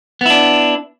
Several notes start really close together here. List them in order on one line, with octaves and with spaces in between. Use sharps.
B3 E4 D4